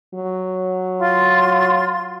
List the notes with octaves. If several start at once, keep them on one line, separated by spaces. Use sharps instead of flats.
F#3
F4 C6